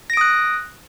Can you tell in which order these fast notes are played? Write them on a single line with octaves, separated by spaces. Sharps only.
A#6 D7 D#6 F#6